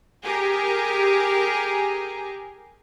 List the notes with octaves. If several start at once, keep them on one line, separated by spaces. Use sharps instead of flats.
G4 G#4 A#4